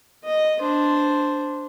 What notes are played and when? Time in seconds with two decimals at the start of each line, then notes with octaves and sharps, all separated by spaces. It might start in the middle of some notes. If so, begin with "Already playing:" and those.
0.24 D#5
0.59 D4 C5